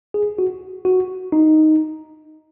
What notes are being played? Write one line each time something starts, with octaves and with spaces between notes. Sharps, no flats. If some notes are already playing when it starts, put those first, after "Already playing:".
G#4
F#4
F#4
D#4